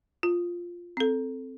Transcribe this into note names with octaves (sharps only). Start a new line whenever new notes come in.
F4
C4 A4